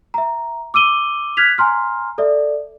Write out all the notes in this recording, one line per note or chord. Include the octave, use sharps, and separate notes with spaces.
E5 A#5
D6 E6 D#7 G7
F6 F#6 G#6 B6 F7
G#5 A#5 C6 F6
A4 D5 E5